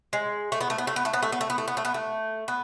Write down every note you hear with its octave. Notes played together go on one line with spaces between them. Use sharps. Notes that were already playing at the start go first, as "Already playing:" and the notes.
G#3
A3
B3
A3
B3
A3
B3
A3
B3
A3
B3
A3
B3
A3
B3
A3
B3
A3
B3